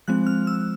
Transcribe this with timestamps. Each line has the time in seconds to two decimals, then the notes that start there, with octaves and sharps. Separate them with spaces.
0.08 F3 G#3 C4 F#6
0.27 F6
0.47 E6